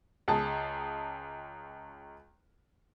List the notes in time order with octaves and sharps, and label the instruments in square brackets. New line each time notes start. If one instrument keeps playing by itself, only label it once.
[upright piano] C#2 G#4 A5